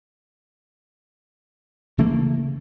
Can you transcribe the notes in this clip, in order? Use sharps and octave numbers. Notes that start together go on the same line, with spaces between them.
C#3 E3 A3 A#3